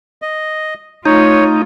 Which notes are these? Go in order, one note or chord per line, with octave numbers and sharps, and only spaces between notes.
D#5
A3 D#4 F4 C#5